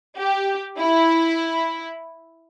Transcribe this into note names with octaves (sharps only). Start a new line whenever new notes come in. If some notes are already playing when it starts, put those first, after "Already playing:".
G4
E4